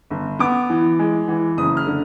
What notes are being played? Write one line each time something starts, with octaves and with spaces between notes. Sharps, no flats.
G1
B3 D6
E3
G#3
E3
F#1 D#6
F6
D3